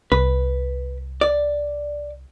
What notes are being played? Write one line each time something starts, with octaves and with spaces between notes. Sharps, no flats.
C2 B4
D5